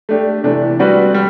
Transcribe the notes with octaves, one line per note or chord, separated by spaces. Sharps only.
A3 D4 G4
C3 E3 A3 D4
G3 C4 F#4 B4 D5
G3